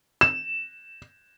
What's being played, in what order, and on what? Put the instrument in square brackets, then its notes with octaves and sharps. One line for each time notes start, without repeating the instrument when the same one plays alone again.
[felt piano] E7